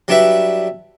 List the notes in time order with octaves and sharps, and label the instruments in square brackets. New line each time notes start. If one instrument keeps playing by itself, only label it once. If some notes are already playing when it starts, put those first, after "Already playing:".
[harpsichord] F#3 G3 D4 E4 B4 E5